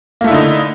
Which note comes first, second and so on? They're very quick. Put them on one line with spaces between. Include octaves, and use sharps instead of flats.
A#3 A3 E4 D3 D#4